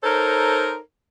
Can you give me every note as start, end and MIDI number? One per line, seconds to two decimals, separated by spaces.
0.04 0.78 63
0.04 0.78 69
0.04 0.78 70
0.04 0.78 72
0.04 0.78 73